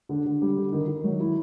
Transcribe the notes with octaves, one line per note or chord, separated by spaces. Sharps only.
D3
D3
G3
D3
D#3
D#3
F#3
E4